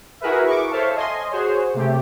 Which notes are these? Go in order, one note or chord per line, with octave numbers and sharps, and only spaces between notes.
E4 F#4 G#4 A#4 B4 E5
C#6 D6
A4 C5 C#5 E5 F5 A5
D#5 G#5 C6
F#4 G#4 C5 C#5
C3 A3 G4